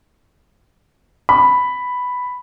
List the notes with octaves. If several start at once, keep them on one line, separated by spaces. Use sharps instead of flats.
B5